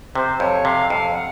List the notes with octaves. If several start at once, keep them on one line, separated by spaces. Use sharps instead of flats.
C3 C5
F2 C#5
C3 F5
F2 F5
F#5